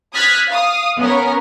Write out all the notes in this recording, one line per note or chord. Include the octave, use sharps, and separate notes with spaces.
D#6 F6 F#6 G#6 A6 B6
F5 D#6
B3 C#4 A#4